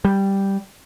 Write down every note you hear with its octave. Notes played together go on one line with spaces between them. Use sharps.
G3